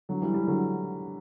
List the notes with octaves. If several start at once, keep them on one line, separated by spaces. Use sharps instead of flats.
D3 F#3
E3 G3
E3 G3
D3 F#3